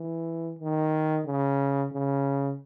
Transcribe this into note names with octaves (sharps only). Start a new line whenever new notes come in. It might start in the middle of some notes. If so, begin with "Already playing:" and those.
Already playing: E3
D#3
C#3
C#3